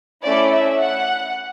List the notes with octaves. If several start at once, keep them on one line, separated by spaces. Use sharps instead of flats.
A3 C#4 E4 D5
E5
F#5